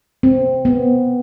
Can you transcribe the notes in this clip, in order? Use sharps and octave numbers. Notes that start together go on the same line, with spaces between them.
C4
B3